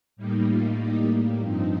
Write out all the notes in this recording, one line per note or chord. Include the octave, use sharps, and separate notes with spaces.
A2 G3 A#3 D#4
F4
D#4 G4
G2 F3 C4 D#4